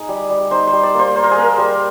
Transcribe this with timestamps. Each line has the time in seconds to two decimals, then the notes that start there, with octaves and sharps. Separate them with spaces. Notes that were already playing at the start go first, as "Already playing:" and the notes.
Already playing: D#4 G#4
0.09 G3
0.30 G3
0.51 D#4 C5
0.67 C5
0.73 G3
0.83 D5
0.94 A#3
0.99 C5
1.15 A#3 C5
1.24 A#4
1.31 G#4
1.37 A#3 A#4
1.58 G3